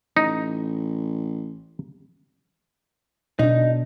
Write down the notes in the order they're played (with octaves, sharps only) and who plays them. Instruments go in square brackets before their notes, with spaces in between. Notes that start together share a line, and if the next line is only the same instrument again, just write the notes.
[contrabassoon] A1 [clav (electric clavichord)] D#4
[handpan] B2 D4 [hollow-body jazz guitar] D#4